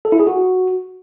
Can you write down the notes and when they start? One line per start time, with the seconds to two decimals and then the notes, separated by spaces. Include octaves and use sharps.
0.05 A4
0.12 E4
0.20 G#4
0.27 F#4